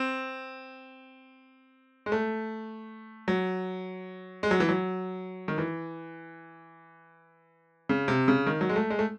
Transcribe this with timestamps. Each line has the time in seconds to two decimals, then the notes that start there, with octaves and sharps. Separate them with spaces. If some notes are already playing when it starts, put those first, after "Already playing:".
Already playing: C4
2.06 G#3
2.12 A3
3.28 F#3
4.43 G#3
4.51 F#3
4.60 E3
4.69 F#3
5.48 D#3
5.58 E3
7.89 C#3
8.08 C3
8.28 C#3
8.47 D#3
8.61 F#3
8.69 G#3
8.76 A3
8.90 G#3
8.99 A3